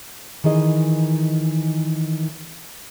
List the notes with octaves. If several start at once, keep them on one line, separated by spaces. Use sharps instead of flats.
D#3 E3 G#4 D#5